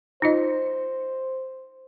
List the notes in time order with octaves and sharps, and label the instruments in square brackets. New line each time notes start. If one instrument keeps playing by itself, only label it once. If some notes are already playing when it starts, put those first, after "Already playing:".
[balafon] D#4 F4 D#5 [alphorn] C5